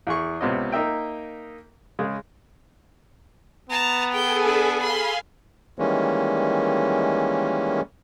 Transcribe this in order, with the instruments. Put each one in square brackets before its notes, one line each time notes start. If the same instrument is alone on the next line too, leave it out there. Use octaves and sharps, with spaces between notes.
[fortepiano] E2 G#4 C#6
C#2 C3 B3 C#4 D#5
A#3 D#4 A#4 E5 G5
C#3 G#3
[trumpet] B3 [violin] A5 A#5
[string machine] G#4 A4 G#5 [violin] G5 G6
[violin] D4 B5
[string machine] F5 G#5 [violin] B5 C6
[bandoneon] D#3 E3 G3 G#3 A#3 C#4